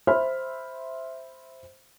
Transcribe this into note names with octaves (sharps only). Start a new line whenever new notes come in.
C5 E5 B5 F6